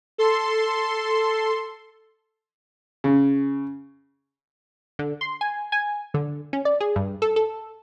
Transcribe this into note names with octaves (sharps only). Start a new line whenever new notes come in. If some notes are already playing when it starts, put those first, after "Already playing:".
A4 C6
C#3
D3
C6
G#5
G#5
D3
C#4
D5
G#4
G2
A4
A4